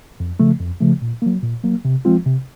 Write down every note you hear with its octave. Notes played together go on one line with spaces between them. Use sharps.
F2
C#3 F3 A3
F2
C#3 F3 A3
A#2
F#3 A#3
A#2
F#3 A#3
C3
F3 G#3 C4 F4
C3